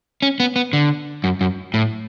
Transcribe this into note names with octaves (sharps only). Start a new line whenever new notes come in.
C#4
B3
B3
D3
F#2
F#2
A2